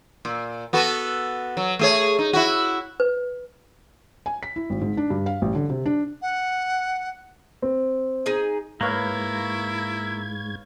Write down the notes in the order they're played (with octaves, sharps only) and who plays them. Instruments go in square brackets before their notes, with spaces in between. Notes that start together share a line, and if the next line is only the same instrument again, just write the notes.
[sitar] A#2
B3 F#4 A4
F#3
A3 G#4 C#5
D#4
E4 F#4
[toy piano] B4
[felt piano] G#5
B6
E4
G#1
G#2
D4
G2
F5
A1
D3
C3
D4
[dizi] F#5
[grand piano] C4
[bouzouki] D#4 G#4 G#5
[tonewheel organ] G#2 G#6 [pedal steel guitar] A#3 [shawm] E4 [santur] B4 C#5 F5